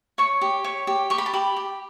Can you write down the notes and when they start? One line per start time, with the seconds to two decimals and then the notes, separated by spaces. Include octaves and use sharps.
0.18 C#5 C#6
0.41 G4
0.64 C#5
0.87 G4
1.10 G4 C#6
1.18 B5
1.26 A5
1.33 G4 B5
1.56 G4